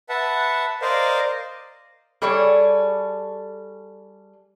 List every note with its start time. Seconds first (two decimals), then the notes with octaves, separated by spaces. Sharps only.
0.09 B4 E5 F#5 A5
0.82 A#4 C5 D5 D#5 F5
2.22 G3 G#4 A4 C#5 D5